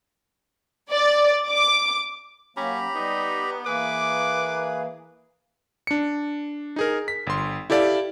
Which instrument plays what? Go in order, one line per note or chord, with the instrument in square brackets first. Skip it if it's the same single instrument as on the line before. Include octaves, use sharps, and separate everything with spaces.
[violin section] D5
D6
[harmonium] F#3 A#3 [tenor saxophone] C#4 [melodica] G4 A#5 B5
[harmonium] G3 [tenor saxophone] B3 [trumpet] D#4
[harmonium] E3 A#3 [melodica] G#4 [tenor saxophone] B4 [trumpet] D6
[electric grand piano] D4 C#7
D#4 G#4 A#4
B6
G1 C6
E4 G4 A4 D5 F5